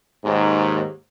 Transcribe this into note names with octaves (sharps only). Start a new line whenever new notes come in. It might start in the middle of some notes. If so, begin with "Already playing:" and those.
D#2 G#2